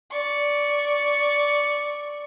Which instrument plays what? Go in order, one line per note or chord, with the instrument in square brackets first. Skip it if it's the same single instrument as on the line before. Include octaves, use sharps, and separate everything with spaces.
[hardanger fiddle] D5 C#6